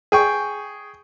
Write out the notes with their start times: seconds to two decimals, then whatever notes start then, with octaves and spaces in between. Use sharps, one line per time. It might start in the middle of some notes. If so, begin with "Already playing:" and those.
0.12 G#4 G5 C#6